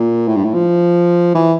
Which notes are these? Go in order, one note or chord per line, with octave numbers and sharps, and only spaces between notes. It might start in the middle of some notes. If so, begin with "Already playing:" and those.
Already playing: A#2
A2
G2
A2
F3
E3